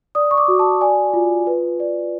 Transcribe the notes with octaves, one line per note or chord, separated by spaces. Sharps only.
D5 D#6
C#6
D6
F#4
A5
D5 G#5
F4
B4
D5